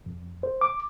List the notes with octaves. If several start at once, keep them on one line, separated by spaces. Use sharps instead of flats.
F2
C5
D6